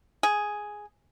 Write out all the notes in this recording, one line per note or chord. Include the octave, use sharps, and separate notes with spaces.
G#4